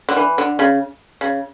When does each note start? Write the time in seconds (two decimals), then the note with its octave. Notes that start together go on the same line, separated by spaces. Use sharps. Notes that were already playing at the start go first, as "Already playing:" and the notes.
0.09 D3
0.16 E3
0.38 D3
0.59 C#3
1.21 C#3